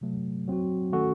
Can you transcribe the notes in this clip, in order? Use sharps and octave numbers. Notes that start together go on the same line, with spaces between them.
C3 F#3 A3
F#3 C4 F#4
D#3 A3 C#4 F#4 A4